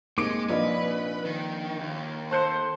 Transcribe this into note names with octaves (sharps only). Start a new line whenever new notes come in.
G#3 A#3 C4 D#4 D6 C#7 D7
A#1 F4 B4 D5 D#5
D#3
D#2
A4 C5 A5 F#6 C#7